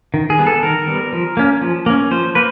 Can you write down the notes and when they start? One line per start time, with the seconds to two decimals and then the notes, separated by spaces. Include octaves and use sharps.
0.14 D#3
0.30 G#4
0.38 G3 B3
0.47 A4
0.63 D#3 A#4
0.87 G3 B3
1.13 F3
1.37 A#3 C#4
1.61 F3
1.86 A#3 C#4
2.11 F3 C5
2.35 A#3 B4